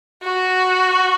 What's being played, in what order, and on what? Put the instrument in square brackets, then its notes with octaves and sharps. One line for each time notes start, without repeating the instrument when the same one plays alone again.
[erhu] F#4